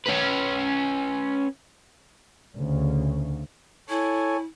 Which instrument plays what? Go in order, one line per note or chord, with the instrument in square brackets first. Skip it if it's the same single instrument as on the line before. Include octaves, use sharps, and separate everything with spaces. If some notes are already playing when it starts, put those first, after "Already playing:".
[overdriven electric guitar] C#4 B4
[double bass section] D2 C#3
[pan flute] E4 [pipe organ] A4 C#5 G#5